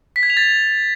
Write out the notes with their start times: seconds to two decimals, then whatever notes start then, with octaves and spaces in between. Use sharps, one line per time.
0.16 B6
0.23 G#6
0.30 F7
0.37 A6